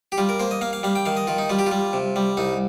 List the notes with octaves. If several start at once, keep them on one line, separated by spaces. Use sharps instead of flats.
G4
G3 F4
A#4
A#3 C5
D#5
A#3 F5
F5
G3 F5
G5
D#3 F5
D#5
D#3 F4
D#4
G3 F4
G4
F4
G3
C3
G3
C2 D#4